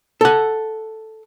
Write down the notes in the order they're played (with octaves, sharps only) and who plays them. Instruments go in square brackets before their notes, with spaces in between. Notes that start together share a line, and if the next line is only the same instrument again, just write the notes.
[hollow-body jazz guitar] A4 F#5